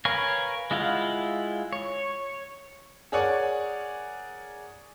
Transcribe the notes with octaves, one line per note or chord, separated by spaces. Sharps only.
A#4 B4 C#5 F5 G#5
G#3 E4 F4 F5 F#5
C#5
G#4 A#4 C#5 D5 F#5 G#5